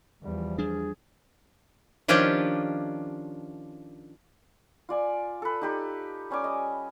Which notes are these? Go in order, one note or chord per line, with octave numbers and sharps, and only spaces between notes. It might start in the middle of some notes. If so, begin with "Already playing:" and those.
E2 F3 G3
G3 D4 G#4
D#3 F3 C#4 D4 F4 G4
F4 D5 G#5
A4 B4
D#4 G4 B4
G3 C#4 G#5 D6
D#5